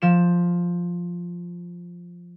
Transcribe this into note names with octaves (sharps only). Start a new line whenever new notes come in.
F3 E7